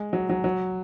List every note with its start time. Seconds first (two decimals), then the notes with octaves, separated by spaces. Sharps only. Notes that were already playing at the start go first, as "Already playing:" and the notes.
Already playing: G#3
0.13 F#3
0.29 F#3
0.44 F#3